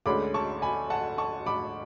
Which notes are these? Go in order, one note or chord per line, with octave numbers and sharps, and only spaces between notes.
D2 D3 G#3 C#4 B5 D6
A5 C#6
G#5 B5
F#5 A5
A5 C#6
B5 D6